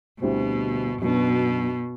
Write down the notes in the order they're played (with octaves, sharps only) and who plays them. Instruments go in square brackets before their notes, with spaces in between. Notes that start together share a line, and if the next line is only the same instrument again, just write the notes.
[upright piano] D2 D3 G3 C4 E4 [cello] B2
[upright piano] F#2 F#3 B3 D4 [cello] B2